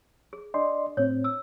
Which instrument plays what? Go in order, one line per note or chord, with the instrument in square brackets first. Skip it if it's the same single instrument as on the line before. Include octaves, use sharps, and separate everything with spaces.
[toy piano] G#4
[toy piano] D4 [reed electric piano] D5 D#5 C6
[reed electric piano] A2 C4 [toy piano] C#5
[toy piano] E6